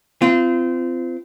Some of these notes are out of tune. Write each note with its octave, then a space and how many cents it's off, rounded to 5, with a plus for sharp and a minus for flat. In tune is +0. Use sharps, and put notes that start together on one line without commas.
C4 -25 F4 -30